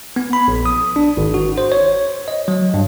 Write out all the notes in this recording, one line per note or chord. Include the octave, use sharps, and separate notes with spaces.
B3
B5
A#1
D#6
D4
G#1
F#4
C5
C#5
D#5
F#3
G2